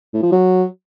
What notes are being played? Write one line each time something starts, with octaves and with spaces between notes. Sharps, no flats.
A2
F3
F#3